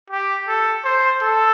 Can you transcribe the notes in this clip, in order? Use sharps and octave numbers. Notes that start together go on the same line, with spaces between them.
G4
A4
C5
A4